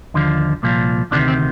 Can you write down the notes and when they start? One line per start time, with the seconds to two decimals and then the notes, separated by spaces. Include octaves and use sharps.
0.14 D#2 D3 F3
0.63 C2 A#2 F3
1.11 D2 C3 D#3 D4
1.28 C4